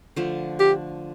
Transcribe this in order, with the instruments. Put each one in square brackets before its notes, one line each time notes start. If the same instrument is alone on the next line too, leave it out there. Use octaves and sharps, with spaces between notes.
[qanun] D3 F3 A3
[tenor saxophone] G4